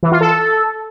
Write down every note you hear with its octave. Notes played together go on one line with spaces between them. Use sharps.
E3
F4
A4